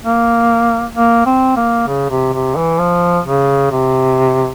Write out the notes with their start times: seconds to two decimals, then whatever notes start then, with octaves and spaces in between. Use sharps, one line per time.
0.03 A#3
0.95 A#3
1.26 C4
1.57 A#3
1.88 C#3
2.10 C3
2.33 C3
2.57 E3
2.79 F3
3.26 C#3
3.72 C3